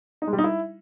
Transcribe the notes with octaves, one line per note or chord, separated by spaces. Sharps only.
D#4
G#3
G3
D#4
E4